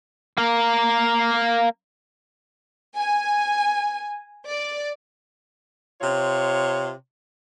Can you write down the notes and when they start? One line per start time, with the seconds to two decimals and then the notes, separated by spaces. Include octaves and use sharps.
0.37 A#3 A#4
2.95 G#5
4.49 D5
6.01 C3 F4 C#5